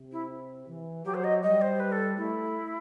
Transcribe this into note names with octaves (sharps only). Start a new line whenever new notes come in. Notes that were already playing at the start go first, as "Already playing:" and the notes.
Already playing: C3
E4
E3
F#3 G4
C5
D#5
G3 D#5
C5
B4
A4
A3 E4